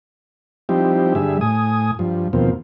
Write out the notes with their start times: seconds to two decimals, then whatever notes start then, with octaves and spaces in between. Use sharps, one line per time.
0.69 F3 G3 C4 D#4 E4 G4
1.15 G2 D3 G3 G#4 E5
1.41 A2 G#5 D#6
1.99 G2 F3
2.33 D#2 B2 F3 A#3 C4